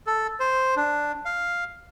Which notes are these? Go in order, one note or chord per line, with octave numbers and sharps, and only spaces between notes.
A4
C5
D4
F5